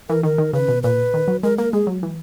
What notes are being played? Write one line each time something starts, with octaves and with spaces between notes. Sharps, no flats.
E3 A#4
D#3 A#4
D#3
C#3 B4
B2
A#2 B4
D#3
F#3
G#3 A#4
A#3 A#4
G#3 G#4
F#3
E3